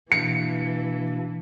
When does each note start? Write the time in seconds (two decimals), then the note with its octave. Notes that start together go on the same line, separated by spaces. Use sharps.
0.12 B2 E3 A#3 D4 C#7